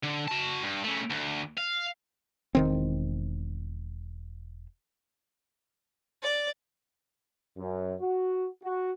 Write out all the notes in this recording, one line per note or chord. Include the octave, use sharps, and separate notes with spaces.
D3
F#4 A5
G2
C#3 A3
D2
F5
E1 D#3 C4
D5
F#2
F#4
F#4